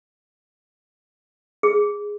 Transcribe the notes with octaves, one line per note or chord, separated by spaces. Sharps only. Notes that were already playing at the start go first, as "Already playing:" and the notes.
G#4